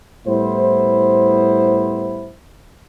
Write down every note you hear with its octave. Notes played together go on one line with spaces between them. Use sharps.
A2 G3 B3 E4 C5